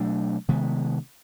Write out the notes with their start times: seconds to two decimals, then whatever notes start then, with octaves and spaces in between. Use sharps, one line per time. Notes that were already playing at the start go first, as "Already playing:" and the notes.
Already playing: B2 F#3 A3 D4
0.48 C3 D#3 G#3 B3